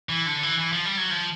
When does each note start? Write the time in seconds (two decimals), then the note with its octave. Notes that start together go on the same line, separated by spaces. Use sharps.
0.09 E3
0.26 D3
0.43 E3
0.60 E3
0.72 F3
0.86 G3
0.97 F#3
1.10 F3